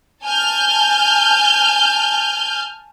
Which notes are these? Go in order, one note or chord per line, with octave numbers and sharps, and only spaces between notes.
G#5 A5 F6 G6